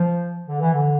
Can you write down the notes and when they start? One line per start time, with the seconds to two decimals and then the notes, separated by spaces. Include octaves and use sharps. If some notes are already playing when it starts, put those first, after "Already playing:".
Already playing: F3
0.48 D3
0.60 E3
0.73 D3